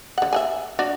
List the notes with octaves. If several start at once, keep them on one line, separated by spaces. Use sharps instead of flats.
D3 F#5
E5 F#5 G#5
D4 F#4 D5